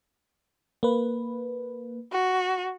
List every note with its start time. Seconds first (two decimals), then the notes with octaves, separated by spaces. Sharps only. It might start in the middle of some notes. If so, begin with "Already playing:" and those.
0.83 A#3 B4
2.12 F#4